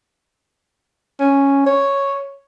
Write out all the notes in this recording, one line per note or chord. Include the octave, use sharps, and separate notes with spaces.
C#4
C#5